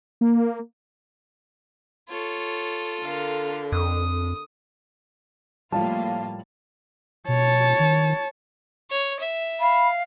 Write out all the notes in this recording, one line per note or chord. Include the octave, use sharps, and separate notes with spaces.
A#3
F4 A4 C#5
D3 A#4 F5
F2 D#6
A2 F3 G3 A#3 F4 F5 A5
B2 C#5 A5
D#3
C#5
E5
F5 B5